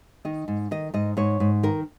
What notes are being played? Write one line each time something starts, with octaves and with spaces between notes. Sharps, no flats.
D#3 D#5
G#2
D#3 D#5
G#2 D#5
G#2 C#5
G#2
D#3 A#4